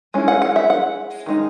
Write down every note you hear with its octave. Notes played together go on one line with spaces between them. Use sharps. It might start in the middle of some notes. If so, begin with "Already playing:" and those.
G#3 C#4 E4
F#5
F#5
E5
F#5
D#3 G#3 D#4